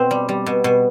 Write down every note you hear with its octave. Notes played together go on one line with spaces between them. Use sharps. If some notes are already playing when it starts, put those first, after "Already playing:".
Already playing: B2 C4
G3
G3
B2
B2